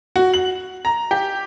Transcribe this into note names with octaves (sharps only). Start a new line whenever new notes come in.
F#4
F#7
A#5
G4